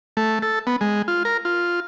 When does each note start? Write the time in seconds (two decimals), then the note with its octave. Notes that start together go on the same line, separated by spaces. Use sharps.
0.17 A3
0.42 A4
0.67 B3
0.81 G#3
1.08 F4
1.25 A#4
1.45 F4